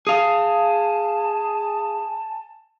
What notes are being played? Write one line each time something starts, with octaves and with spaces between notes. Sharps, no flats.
G#4 F5 G#5 A5